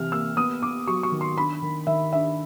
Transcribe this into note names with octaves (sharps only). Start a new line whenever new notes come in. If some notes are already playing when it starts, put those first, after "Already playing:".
Already playing: C3 E3 F6
A#3 E6
B3 D#6
B3 D6
F#3 C#6
C#6
D#3
C6
D4 B5
D#3
D#3 E5
D4 E5